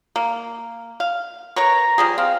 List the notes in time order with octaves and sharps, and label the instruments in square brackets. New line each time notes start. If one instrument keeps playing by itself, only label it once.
[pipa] A#3
F5
[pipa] A#4 B4 C#5 [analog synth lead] A#5
[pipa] F3 G3 G#4
[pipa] C4 [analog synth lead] F5